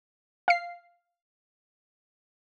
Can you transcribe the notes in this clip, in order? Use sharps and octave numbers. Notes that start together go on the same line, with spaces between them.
F5 C7